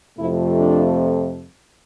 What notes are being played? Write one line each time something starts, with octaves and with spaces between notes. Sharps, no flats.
F2 C3 F3 A3 E4
D4